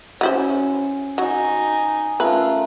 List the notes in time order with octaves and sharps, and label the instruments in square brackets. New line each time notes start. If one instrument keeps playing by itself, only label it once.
[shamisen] F#3 E4 C5 [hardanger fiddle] C#4
[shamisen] F#3 [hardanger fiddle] D#4 G#5
[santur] A3 C#4 A#4 [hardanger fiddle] F4 [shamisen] B4